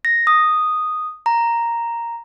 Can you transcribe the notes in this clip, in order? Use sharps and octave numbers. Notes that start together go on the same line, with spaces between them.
A#6
D#6
A#5